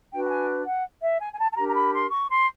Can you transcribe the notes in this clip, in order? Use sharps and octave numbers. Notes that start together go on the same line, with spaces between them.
D4 F#4 B4 G5
G5
G#5
F#5
E5
G#5
G#5
A5
A5
D4 G4 A#4 A#5
A#5
B5
C6
C#6
C6